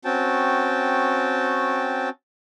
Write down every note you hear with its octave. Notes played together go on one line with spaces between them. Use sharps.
C4 C#4 F#4 G5 A5